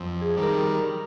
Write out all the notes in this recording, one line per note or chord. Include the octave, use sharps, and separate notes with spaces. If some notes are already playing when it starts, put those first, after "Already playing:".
Already playing: F2
G#4
D#3 G3
A#4